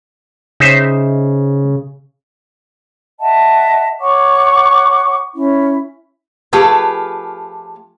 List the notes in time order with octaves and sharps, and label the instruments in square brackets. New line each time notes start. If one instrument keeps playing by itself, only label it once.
[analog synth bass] C#3 [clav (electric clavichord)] D#4 C5 E5
[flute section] D#5 E5 F#5 A5
C#5 F#5 C#6 D6
C#4 E4
[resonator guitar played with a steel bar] F3 A3 F4 G4 G#4 B4